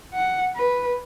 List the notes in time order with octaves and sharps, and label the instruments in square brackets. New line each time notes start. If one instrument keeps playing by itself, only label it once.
[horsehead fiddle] F#5
B4